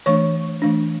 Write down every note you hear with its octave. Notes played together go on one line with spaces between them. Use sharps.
E3 A3 D4 C#5 C#6
E3 A3 D4